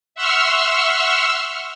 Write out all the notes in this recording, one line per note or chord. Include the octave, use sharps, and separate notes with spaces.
E5 F#5 C6 C#6 E6 F6